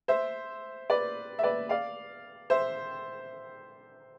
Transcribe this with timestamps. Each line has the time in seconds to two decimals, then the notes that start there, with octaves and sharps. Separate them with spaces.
0.08 C5 E5
0.90 B4 D5
1.39 E5
1.43 B4 D5
1.69 D5 F5
2.50 C5 E5